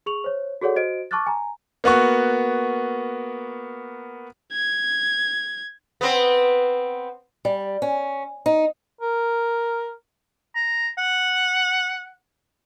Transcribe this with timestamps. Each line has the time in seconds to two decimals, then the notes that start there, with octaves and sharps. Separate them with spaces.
0.06 G#4 C#6 F7 F#7
0.24 C5 C#5
0.61 F#4 G#4 A4 C#5 D5 F#5
0.76 F#4 C5 D#5 D7
1.11 A5 C#6 D6 F6 F#6 A6
1.27 G#5 A#5
1.84 A#3 B3 F#4 C#6
4.53 G#6
6.01 B3 C4
7.45 G3
7.82 C#4
8.46 D#4
9.02 A#4
10.55 A#5
10.98 F#5